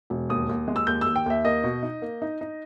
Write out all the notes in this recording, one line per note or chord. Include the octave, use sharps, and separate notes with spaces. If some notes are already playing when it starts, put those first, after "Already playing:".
E1
D#2 D#6
D#2
G#3
E6
D#2 G6
D#2 E6
G5
D#2 E5
A#3 D#5
B2
D#4
A#3
D#4
D#4